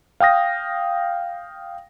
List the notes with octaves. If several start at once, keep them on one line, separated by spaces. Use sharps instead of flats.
F5 G5 D#6 A#6